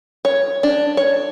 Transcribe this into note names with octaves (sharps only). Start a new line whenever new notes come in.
C#5
D4
C#5